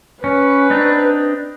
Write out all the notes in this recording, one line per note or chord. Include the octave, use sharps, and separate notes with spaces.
C#4 B4
C4 D4 D#4